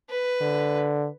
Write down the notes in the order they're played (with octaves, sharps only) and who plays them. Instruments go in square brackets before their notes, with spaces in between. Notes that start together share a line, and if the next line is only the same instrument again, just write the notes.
[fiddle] B4
[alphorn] D3